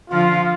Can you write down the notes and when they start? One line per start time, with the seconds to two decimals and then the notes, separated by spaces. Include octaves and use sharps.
0.11 D3 F3 F4